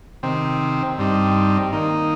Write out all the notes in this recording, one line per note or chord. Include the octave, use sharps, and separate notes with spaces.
C3 D#3 C4
G2 G3 C4 D#4
D#3 A#3 D#4